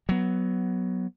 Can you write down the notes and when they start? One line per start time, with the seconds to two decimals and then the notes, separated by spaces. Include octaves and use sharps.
0.09 F#3 B3